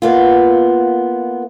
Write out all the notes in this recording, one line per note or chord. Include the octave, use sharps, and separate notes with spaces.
A#3 B3 F4